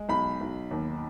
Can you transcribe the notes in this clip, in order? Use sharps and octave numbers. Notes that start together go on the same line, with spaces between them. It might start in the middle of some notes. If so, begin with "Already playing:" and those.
Already playing: G#3
B1 B5
B1
D#2